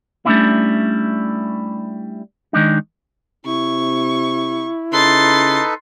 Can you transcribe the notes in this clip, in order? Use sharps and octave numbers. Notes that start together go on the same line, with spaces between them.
G3 A3 A#3 C#4 D4 E4
D#3 G#3 D4 D#4
C3 E4 C#6
C#3 D#4 A4 B4 C6 A6